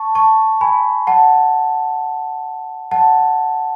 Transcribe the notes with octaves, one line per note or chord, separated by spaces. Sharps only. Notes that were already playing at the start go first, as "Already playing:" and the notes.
Already playing: A5 C#6
A5 C#6
G#5 B5
F#5 A5
F#5 A5